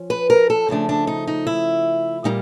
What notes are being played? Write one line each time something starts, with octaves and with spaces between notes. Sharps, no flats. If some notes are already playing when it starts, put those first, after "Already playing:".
Already playing: F3 C#4
B4
A#4
A4
C#3 F3 A3 D4
D4
D#4
D#4
E4
A#2 G3 A#3 D#4